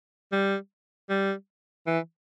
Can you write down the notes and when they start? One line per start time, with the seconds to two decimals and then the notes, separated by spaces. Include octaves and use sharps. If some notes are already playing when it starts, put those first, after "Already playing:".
0.32 G3
1.09 G3
1.87 E3